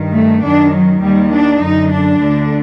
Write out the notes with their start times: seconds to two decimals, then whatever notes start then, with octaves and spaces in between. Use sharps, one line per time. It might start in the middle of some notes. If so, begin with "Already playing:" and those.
Already playing: G2 D#3
0.15 A3
0.44 F#2 D#3 D4
0.74 F#3
1.03 D#2 D#3 G3
1.32 D4
1.62 F#2 D3 D#4
1.92 D4
2.21 D2 D3